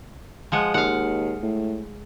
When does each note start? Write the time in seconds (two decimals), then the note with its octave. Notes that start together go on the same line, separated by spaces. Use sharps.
0.52 F3 G#3 F#5
0.74 D#2 F5 F#5
1.42 A2